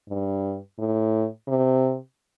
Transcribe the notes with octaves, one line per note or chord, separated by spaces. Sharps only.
G2
A2
C3